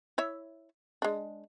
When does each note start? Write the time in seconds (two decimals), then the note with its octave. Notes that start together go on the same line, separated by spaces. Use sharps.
0.18 E4 C#5 E5
1.02 G#3 D4